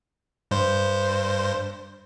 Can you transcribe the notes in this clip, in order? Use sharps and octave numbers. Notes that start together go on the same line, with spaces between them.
G2 C5